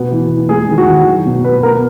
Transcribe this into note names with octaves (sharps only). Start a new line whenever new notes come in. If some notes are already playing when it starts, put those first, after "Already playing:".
Already playing: B2 B3
E3
E3
G#3 G#4
D#3
F#4
D#3
F#3
B2
B2 B4
B3 A#4